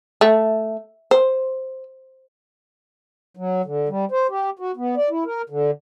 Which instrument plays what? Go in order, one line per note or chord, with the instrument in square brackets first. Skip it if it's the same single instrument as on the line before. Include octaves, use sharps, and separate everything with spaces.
[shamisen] A3
C5
[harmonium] F#3
D3
G3
C5
G4
F#4
B3
D5
E4
A#4
D3